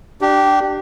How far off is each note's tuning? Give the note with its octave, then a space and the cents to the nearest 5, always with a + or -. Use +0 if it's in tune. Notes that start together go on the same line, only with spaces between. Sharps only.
D4 +15 G4 -15